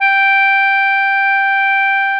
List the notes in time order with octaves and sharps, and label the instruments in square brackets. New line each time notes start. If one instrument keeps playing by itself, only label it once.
[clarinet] G5